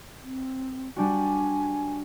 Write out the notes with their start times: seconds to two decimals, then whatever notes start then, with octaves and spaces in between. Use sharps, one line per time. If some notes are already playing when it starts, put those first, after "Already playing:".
0.23 C4
0.96 G3 D4 F#4 G#5